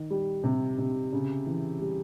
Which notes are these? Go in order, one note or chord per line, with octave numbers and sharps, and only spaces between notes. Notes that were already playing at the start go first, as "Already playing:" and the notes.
Already playing: D#3
G3
C3
C3
C#3
E3
G3